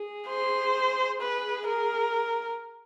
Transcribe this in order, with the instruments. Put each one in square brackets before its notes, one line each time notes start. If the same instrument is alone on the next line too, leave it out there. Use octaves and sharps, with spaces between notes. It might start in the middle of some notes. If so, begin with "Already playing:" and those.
Already playing: [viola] G#4
[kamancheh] C5
[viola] G#4 [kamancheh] B4
[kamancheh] A#4